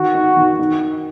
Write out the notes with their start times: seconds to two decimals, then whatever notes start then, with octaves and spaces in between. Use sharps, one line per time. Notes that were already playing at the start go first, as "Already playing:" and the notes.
Already playing: D#3 F#4
0.14 D#4
0.37 D#3
0.59 D#4